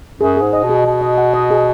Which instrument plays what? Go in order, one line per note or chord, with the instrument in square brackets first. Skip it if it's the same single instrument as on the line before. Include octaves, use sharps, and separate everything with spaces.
[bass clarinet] F#2 [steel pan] G#4
[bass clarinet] G#2 [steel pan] G#4
[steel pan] D#5
[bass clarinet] B2
[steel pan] G#4
[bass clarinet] B2 [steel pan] D#5
[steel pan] D#5
F#5
D#5
G#4